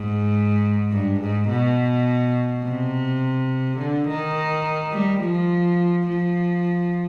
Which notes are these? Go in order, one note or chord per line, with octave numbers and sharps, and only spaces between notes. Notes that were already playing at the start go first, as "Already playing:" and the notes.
Already playing: G#2
G2
G#2
B2
C3
D3
D#3
G3
F3
F3